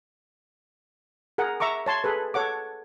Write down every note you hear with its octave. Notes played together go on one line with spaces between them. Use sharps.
G#4 A#4 F#5
E5 A#5 C#6 D6
C#5 A5 C6
G#4 A4 B4
A4 C#5 F#5 D6